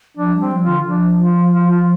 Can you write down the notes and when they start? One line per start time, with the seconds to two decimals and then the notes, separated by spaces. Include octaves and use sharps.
0.17 F3 D4
0.34 G3
0.40 C4
0.51 F3
0.62 F4
0.68 D3
0.86 F3 D4
1.20 F4
1.54 F4
1.71 F4